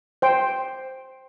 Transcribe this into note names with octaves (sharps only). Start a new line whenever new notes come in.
C5 G5